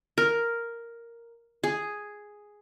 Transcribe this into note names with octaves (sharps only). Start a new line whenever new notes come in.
A#4
G#4